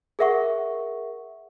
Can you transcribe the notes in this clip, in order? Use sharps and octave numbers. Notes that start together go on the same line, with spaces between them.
G#4 A#4 E5 F#5 C#6